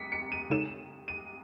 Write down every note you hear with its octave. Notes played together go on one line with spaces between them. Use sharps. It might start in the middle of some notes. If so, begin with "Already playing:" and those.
Already playing: B6 C#7 D#7
C#7
D#7
C#3 G#3 D#4 A4 C#5 E7
D#7